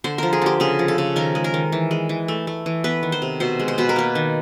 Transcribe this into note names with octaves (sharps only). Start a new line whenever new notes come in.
D3 C5
F3 A#4
G#4
D3 G4
C#3 G#4
F3
A4
C#3
D#3 A#4
G#3
A#4
D#3
E3
G#3
E3
A3
A3
E3
B3 B4
D#3
C5
C3
B2 C5
G#3
C5
B2 B4
A#4
A#3 B4
D#3